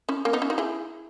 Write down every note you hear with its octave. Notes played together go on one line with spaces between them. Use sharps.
C#4 E4
A#3 C#4
B3 D#4
C#4 E4
D#4 F#4
E4 G#4